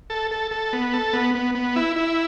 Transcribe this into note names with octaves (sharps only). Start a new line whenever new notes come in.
A4
A4
A4
B3
A4
B3
B3
B3
E4
E4